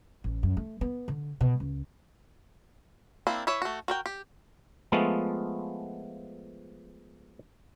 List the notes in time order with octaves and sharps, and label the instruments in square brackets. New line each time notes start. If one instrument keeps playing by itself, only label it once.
[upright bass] A1
F#2
A3
B3
D3
B2
C#2
[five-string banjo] A#3 C4 D4 E4
E3 B4 C#5 E5
A3 F#4
F#4 A#4 G5
G4
[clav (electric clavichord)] F3 G#3 A3 B3 F4